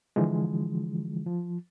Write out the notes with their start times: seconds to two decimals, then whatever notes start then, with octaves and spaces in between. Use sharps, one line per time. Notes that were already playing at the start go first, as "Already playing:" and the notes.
0.16 D3 E3 F3 G#3
1.26 F3